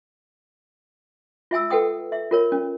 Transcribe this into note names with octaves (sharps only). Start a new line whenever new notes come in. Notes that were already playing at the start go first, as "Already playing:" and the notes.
F4 E5 G#5 E6
A4 B4 F#5 G5 D#6
E5
F4 A#4 C#5
C#4